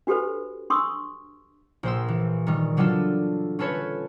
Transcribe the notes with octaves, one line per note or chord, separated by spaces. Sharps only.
D4 F#4 G4 A4 B4 C5
D4 C6 C#6 D#6 E6
A#1 C5 E6
E3
D#3 G3
D3 F#3 G3 D4 F4 A4
C#4 F4 A4 B4 C#5